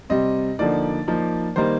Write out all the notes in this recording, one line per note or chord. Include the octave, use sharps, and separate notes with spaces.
C3 G3 C4 D#5
D3 F3 A#3 D#4 D5
F3 A#3 D#4
D#3 G3 A#3 D#4 C5